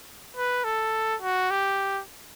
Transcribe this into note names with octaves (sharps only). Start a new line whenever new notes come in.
B4
A4
F#4
G4